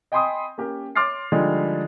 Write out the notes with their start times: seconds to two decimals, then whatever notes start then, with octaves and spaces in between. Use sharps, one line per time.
0.12 D#5 G5 G#5 B5 C6 D#6
0.58 A#3 C#4 G4 A#4
0.95 C#5 C6 D6 F6 A6 C7
1.32 D3 F3 G3 G#3 D4 D#4